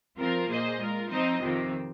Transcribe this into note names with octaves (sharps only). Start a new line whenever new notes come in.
F3 C4 F4 A#4
A#2 A#3 G#4 C5 D#5
G#3 F4 A#4
F3 C4 D#4 C5 D#5
F2 C3 D#3 C4